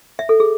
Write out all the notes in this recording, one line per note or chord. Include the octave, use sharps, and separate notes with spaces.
E5
A4
G#4